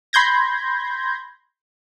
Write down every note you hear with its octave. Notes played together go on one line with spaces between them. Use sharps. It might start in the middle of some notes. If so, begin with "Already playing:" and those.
B5 C6 G6 G#6 A#6